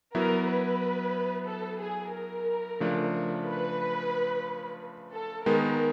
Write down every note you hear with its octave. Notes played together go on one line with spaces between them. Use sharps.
F#3 B3 E4 A#4
B4
A4
G#4
A#4
C#3 F3 A3 D4
B4
A4
D#3 G#3 B3 A#4